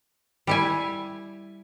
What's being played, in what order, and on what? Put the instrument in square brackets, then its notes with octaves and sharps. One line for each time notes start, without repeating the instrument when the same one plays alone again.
[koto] G3 E4 G#5